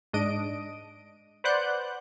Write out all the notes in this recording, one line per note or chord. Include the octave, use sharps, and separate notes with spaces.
G#2 D4 D#5 D7 D#7
B4 C5 D5 F#5 F#6 G6